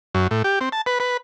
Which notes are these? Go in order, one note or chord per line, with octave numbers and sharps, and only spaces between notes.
F#2
A2
G4
C4
A5
B4
B4